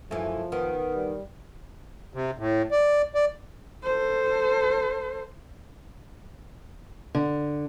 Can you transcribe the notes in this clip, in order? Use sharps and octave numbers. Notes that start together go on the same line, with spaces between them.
F#2 E3 F3 A3
D#3 B3
G3
C3
A2
D5
D5
A4 C5
D3